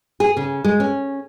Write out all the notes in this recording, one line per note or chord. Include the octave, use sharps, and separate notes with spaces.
G#4
C#3
G#3
C#4